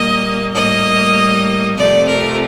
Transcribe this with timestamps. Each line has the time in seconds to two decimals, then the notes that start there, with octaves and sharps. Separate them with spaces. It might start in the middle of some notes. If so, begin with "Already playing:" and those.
Already playing: A#2 G3 A#3 D#5
0.54 A2 G3 A#3 D#5
1.77 F2 C3 F3 A3 D5
2.07 A#4